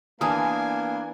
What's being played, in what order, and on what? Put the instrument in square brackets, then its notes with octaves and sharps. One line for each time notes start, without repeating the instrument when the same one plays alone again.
[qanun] E3 A#4 [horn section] A#3 B3 D4 [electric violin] G#5 [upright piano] A5 D#6